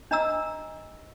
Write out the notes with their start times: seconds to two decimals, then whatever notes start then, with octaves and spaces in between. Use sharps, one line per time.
0.11 D4 D#5 A#5 E6